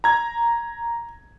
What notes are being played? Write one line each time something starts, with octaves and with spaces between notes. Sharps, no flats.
A#5 G#6